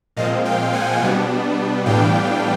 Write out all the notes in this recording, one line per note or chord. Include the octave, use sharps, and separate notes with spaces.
A#2 F3 G#3 C4 D#5 F5
F5 G5
F#5 G#5
B2 G3 B3 D4
A2 E3 G3 B3 D4 F5 G5